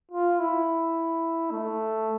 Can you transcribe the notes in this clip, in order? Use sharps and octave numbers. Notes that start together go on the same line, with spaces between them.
F4
E4
A3